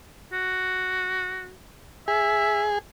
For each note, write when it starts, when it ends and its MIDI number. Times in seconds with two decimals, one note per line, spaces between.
0.33 1.54 66
2.08 2.79 68
2.08 2.66 76